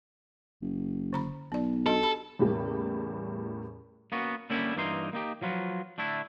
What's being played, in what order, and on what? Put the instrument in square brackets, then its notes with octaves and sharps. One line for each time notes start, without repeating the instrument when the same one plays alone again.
[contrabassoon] F#1
[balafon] D3 A#5 B5
[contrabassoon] B1 [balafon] B3 D5
[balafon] D4 F#4 D#5 [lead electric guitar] A4
[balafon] G4 B5
[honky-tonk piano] E2 A2 C#3 G3 A#3 C#4
[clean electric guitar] A#3 B3 C#4 F#4
D3 G3 A#3 C#4 E4
G2 E3 A#3 C4 D#4 C6
A#3 D#4 G4
F3 F#3 F4 B4
D3 A3 D4 E4